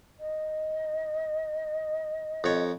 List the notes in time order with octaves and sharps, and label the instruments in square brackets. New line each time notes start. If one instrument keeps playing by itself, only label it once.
[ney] D#5
[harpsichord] F2 C#5